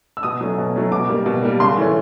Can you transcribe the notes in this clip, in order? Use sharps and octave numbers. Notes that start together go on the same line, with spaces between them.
E6
B2 D#6
F#3 A3 C#4
B2
F#3 A3 C#4
B2 D6
G3 A#3
B2
G3 A#3
C#3 C6
E3 A3 C#4